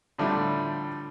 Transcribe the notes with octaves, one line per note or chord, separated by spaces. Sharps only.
A2 D3 F3 G3 A3